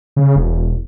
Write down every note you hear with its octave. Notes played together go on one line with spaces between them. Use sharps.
C#3
E1